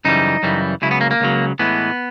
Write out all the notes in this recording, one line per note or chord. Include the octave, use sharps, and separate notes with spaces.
F#2 C#3 E3 G3 D#4
F#2 C#3 E3 G3
C#2 C#3 F#3 E4
B3
A#3
A#3
C#2 C#3 F#3
A2 E3 G#3 B3